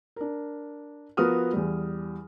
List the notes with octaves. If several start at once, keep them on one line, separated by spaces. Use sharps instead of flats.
D4 A#4
F3 B3 F#4 A#4 D#6 F6
E2 G3